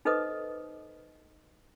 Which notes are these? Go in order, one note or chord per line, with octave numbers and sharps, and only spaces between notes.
D#4 A4 B4 C5 D#5 D#6